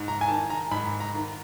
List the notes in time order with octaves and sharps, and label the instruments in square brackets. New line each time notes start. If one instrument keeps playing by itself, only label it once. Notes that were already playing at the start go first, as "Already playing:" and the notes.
Already playing: [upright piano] G#2
A#5
G#5
D#3 A5
A#5
G#2 B5
A#5
D#3